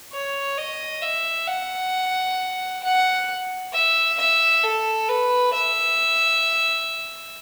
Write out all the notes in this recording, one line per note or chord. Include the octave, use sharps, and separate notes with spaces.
C#5
D#5
E5
F#5
F#5
E5
E5
A4
B4
E5